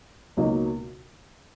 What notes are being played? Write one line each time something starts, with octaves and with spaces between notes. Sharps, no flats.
C#2 B2 F#3 A#3 D#4